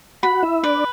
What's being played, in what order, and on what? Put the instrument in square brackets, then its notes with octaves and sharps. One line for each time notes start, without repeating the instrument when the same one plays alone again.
[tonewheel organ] F#4 F#5 [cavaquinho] B5
[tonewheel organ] E4 E5
[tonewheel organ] D4 D5 [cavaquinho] B4